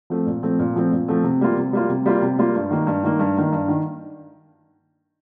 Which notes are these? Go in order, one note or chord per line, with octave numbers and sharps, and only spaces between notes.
F3 A3 C4
A#2
F3 A3 C4
A#2
F3 A3 C4
A#2
F3 A3 C4
C3
G3 A#3 F4
C3
G3 A#3 F4
C3
G3 A#3 F4
C3
G3 A#3 F4
G2
D#3 A#3
G2
D#3 A#3
G2
D#3 A#3
G2
D#3